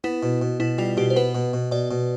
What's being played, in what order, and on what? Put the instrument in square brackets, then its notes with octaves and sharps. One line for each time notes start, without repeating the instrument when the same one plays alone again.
[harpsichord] B3 [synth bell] E4
[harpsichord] B2
B2
[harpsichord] B2 [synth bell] E4
[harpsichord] G3 [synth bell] F4
[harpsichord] B2 [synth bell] G4
[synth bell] C5
[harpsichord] B3 [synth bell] B4
[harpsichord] B2
B2
[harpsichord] B2 [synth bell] D5
[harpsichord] B2